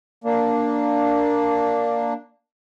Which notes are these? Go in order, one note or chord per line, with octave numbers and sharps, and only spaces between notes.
A#3 D4